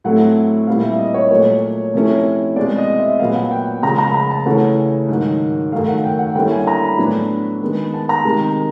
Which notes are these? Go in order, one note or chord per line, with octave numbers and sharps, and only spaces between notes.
A2 F#3 A3 C4 E4 F#5
A#2 G3 C4 E4 F5
E5
D#5
C#5
A#2 F#3 A3 C#5
C3 F3 A3 C#4 E4
B2 G#3 C4 D5
D#5
E5
A#2 F#3 B3 F5
F#5
G5
C#3 F3 G#3 A#5
A#5
B5
A#5
A5
C#3 E3 A3 C#4 F#5
G#2 D#3 F#3
F#2 D#3 F#3 A3 F5
F#5
G5
F#5
D3 G3 A#3 C#4 E4 G5
G#5
A#5
B5
A2 F#3 B3 D4
D#3 G#3 B3
A5
A#5
C3 D#3 G#3